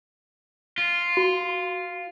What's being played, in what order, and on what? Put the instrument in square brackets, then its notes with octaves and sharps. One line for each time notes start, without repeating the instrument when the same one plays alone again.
[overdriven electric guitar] F4
[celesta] F#4